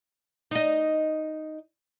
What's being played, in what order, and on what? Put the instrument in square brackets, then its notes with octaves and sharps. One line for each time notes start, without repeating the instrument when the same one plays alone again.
[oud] D#4 D#5